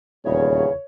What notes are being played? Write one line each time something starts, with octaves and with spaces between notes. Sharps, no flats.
D#1 E2 C#3 C#5